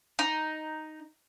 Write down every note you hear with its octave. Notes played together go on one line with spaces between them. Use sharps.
D#4